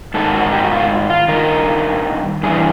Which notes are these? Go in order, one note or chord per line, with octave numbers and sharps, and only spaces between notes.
G#2 D#3 A4
F#4
G4
F#4
F4
F4
G2 D#3 A#4
G2 E3 G#4